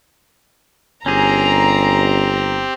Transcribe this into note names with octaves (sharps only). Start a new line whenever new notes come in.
G1 C4 C#4 G4 G#4 A#5